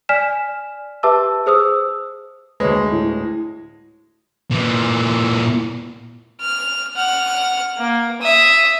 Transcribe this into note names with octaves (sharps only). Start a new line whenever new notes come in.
D5 G#5 F6 B6 E7
G4 B4 E5 A5 D6 E6
G#4 C5 D#6 E6
D2 G#3 B4 C#5
A2
A#2 E3
F6
F#5 F6
A#3
E5 D#6